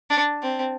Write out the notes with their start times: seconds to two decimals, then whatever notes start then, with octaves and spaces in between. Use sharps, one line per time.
0.10 D4
0.42 C4